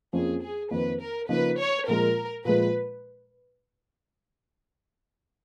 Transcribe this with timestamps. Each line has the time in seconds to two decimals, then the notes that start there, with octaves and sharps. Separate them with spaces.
0.13 F2 F3 A#3 C#4 G#4
0.42 G#4
0.71 F2 D#3 A#3 D#4 B4
1.01 A#4
1.29 C#3 F3 A#3 D#4 B4
1.59 C#5
1.88 A#2 F3 G#3 A#4
2.45 A#2 F3 G#3 B4